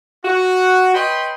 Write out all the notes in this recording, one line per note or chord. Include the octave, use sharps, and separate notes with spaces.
F#4
B4 C#5 D#5 G5 B5 C6